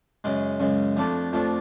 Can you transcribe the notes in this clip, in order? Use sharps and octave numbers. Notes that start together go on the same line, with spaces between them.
F#2 C#3 G#3
F#2 C#3 G#3
F2 F3 A3 D4
F2 F3 A3 D4